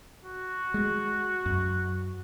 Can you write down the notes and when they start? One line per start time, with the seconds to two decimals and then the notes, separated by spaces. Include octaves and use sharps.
0.24 F#4
0.74 G#3
1.46 F#2